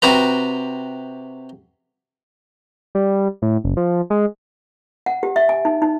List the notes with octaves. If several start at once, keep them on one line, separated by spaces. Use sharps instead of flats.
C3 F#4 B4 A#5
G3
A2
F#1
F3
G#3
F#5
G4
E5
G#5
D#4
D#4